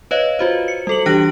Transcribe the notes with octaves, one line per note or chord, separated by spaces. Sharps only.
B4 C#5 D#5 F5
F4 F#4 C5
C#7
G3 A4 F#7
E3 D4 G4 F#6 A#6 D7